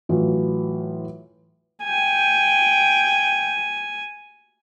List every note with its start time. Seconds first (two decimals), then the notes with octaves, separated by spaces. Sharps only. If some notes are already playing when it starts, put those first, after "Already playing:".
0.09 A2 E3 F#3 F4
1.84 G5 G#5